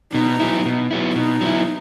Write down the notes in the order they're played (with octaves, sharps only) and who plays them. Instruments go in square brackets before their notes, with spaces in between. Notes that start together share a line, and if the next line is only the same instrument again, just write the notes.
[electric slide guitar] B2 [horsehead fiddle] D#4
[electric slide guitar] F#3 B3 E4
B2
F#3 B3 E4
[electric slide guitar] B2 [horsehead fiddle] D#4
[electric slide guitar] F#3 B3 E4